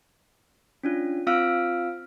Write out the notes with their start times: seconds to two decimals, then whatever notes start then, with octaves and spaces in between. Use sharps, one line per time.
0.83 C#4 D4 F4
1.27 C4 F4 F5 E6 F6 D7